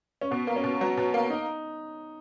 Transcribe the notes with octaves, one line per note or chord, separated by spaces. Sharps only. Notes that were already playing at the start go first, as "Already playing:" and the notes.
C#4
B2 B3
A#3
C#4
B2
F#3 B3
B2
A#3
D#4